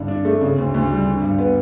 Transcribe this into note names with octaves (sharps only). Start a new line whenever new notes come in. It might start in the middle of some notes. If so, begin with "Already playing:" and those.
Already playing: G2 D3
D4
A3
C#3
D2
D2
G3
D3
G2
B3